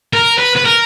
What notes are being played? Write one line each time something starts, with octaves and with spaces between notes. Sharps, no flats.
A#4
B4
B4
A#4